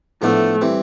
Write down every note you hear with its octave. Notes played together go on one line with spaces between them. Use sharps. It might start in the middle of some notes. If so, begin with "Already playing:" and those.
A2 F3 A3 B3 D4
E3 G3 C4